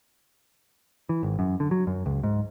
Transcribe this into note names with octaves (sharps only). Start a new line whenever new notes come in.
E3
G#1
F#2
D3
F#3
F#2
C#2
G#2